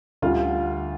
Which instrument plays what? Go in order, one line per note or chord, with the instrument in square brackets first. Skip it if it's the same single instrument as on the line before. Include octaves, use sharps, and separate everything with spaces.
[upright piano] D2 D3 G3 F4